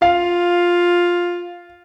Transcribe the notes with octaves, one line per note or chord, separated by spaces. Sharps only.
F4 F5